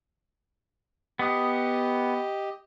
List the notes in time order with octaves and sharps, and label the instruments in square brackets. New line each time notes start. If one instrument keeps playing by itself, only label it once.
[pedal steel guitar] B3 D#6 [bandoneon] G4 D#5